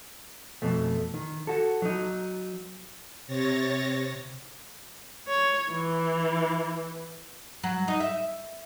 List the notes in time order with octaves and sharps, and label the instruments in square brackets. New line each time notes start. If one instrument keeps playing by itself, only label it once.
[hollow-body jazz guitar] F2 B2 A3
D#3
F#4 A4
F#3 D#4
[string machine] C3 C#5 A6 A#6
[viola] C#5
E3
[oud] F#3
D#4
E5